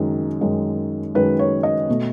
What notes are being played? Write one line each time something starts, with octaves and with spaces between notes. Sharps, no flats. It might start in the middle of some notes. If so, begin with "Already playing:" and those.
Already playing: F#2 D#3 G#3
F#2 D#3 G#3
F#2 D#3 G#3 B4
C#5
D#5
B2 A3